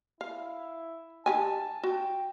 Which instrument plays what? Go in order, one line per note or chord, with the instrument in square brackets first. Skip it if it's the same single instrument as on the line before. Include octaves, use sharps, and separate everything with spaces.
[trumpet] E4 [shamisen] F5
[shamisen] D#3 G4 G#5 [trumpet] A5
[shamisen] F#4 [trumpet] G5